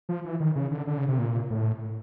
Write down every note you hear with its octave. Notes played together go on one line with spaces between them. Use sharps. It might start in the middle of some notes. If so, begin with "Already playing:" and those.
F3
E3
D#3
C#3
D3
D3
C#3
C3
A#2
A2